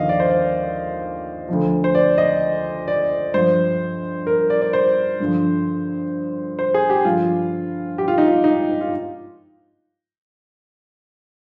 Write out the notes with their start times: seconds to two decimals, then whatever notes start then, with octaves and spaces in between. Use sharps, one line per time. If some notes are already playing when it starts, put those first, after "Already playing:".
Already playing: D#2 D3 F3 D#5 F5
0.09 D5
0.20 C5
0.29 D5
1.49 D2 D3 F3
1.84 C5
1.95 D5
2.18 D#5
2.88 D5
3.34 G2 F3 C5
4.27 A#4
4.50 D5
4.62 D5
4.73 C5
5.20 G2 D3 F3
6.59 C5
6.74 G#4
6.90 G4
7.05 G2 D3 F3 F4
7.98 G4
8.08 F4
8.18 D#4
8.28 F4
8.44 D#4
8.81 F4